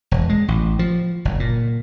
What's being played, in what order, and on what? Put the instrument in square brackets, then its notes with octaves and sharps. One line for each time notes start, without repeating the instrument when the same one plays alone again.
[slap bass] E1
G#3
A1
F3
F#1
A#2